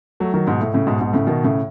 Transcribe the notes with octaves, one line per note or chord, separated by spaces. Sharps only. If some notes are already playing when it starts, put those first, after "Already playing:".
F#3 A3
D#3 F#3
G#2 B2
A2
A2 C#3
G#2 B2
G#2 B2
A2 C#3
B2 D#3
A2 C#3